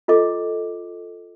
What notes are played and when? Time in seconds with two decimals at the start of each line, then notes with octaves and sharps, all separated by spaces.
0.08 F4 A4 D#5 D6